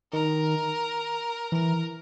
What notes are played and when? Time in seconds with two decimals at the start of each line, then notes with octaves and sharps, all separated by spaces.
0.12 D#3 A#4
1.52 E3 A#4